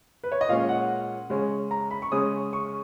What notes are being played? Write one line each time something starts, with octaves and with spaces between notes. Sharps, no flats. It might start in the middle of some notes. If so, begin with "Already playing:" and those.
B4
C#5
D#5
A#2 G#3 C#4 F5
F#5
C#3 G#3 C#4
A#5
B5
C#6
C#3 G#3 C#4 D#6
C#6